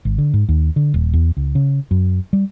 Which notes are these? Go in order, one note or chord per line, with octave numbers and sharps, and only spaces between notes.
G#1
D3
G#2
D#2
D3
D#1
E2
C#2
C#3
F#2
G3